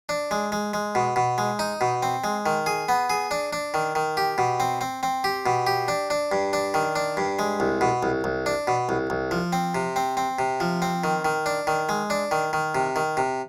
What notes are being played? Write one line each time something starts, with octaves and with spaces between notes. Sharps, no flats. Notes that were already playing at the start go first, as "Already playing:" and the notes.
D4
G#3
G#3
G#3
B2
B2
G#3
D#4
B2
C4
G#3
D#3
G#4
B3
G#4
D4
D4
D#3
D#3
G4
B2
C4
C4
C4
G4
B2
G4
D4
D4
G2
D4
D#3
D4
G2
G#3
C2
B2
C2
C2
D4
B2
C2
C2
F3
C4
C3
C4
C4
C3
F3
C4
D#3
D#3
D4
D#3
G#3
D4
D#3
D#3
C3
D#3
C3